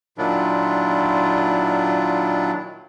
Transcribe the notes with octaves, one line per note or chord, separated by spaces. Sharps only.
A#2 D#3 F#3 D4 E4 F4